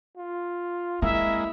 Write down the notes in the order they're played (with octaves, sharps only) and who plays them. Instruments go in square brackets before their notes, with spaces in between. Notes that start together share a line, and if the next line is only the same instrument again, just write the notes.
[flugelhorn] F4
[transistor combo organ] G#3 A#3 [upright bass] C4 [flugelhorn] E4 [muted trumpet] E5